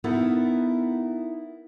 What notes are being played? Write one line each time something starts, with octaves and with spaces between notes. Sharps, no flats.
B3 D#4 E4 A4 A#4